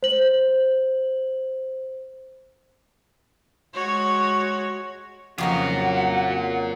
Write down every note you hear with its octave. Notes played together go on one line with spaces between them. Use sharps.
C5 F#7
G#3 F#4 C#5
F2 C#3 F#3 F4 A#4 D#5 F#5